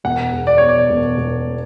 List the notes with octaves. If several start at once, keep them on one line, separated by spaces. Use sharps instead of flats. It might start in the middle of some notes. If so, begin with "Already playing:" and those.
E1 F#5
E2
D5
B2 C#5
D5
E1
E1